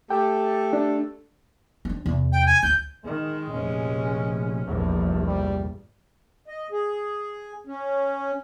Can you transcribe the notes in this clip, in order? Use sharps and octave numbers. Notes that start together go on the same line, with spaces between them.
A3 G4 A4 G5
D4
C4 D4
E2 C3
G5
G#5
G1 D2 G6
D#3 G#3
F1 A#2 C#4
F1 A#1 E2 G2
G3
D#5
G#4
C#4